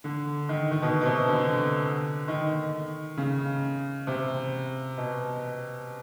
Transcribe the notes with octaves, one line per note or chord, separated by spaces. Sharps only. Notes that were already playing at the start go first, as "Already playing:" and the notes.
D3
D#3
D#3
B2
B2
C3
D3
D3
D#3
C#3
C3
B2